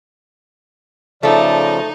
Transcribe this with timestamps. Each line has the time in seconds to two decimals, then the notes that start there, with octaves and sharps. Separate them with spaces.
1.23 C#3 F3 A3 D#4 A4 D5